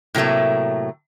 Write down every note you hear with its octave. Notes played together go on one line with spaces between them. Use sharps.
A2 C3 F#3 A3 A#3